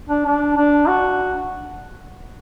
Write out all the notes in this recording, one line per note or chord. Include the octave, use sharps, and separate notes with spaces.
D4
D4
D4
F#4